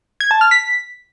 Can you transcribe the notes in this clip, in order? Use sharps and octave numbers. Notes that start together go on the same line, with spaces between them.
G#6
A5
F6
B6